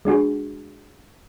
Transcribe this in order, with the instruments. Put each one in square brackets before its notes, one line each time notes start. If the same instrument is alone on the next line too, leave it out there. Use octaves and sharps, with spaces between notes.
[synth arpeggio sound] G#3 D4 F#4 G#4